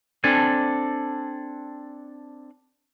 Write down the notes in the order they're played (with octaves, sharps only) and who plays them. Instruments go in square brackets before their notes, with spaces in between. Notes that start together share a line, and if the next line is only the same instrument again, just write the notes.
[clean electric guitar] C4 D4 A4 G#5